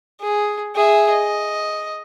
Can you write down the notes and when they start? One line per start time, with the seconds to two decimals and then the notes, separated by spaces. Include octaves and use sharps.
0.22 G#4
0.75 G#4 E5
1.12 D#5